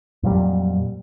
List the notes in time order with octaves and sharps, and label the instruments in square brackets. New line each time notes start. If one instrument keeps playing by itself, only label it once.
[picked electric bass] F2 A#2 F#3 G3